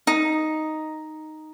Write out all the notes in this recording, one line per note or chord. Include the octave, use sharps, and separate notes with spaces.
D#4